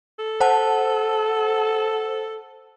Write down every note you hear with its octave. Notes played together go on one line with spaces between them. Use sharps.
A4
C5 F#5 A5